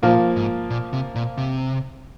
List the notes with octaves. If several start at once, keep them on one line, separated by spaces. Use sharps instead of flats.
A#2 F3 A#3
G#2
A#2
C3
A#2
C3